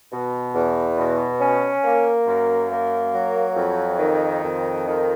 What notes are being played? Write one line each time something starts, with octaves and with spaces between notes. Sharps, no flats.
B2
E2
B2
C#4
A#3
F#2
A#3
F#3
F2
D#3
F2
D#3